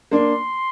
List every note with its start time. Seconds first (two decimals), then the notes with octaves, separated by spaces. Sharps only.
0.11 A#3 D4 C6